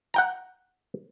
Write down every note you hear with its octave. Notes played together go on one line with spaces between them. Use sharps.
F#5 G5 A#5